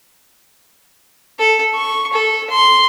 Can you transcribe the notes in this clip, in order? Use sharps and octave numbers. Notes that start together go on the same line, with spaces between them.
A4
C#6
A4
C6